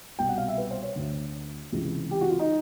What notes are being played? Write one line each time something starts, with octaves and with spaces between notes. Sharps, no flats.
C2 B2 G5
F#5
F5
E5
B4
C5
C#5
D2 D3
C#2 C3 E3
G4
F#4
F4
D#4